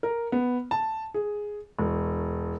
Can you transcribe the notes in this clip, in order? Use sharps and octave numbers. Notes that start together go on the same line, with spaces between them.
A#4
B3
A5
G#4
E1